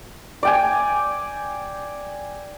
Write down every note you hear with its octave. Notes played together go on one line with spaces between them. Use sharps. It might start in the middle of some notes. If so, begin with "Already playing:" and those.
D5 G5 G#5